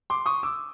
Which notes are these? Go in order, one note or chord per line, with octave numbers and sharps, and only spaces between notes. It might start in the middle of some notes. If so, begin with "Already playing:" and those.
C6 D6
C#6 D#6
D6 E6